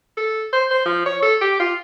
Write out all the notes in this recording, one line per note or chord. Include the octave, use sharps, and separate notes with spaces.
A4
C5
C5
F3
C#5
A4
G4
F4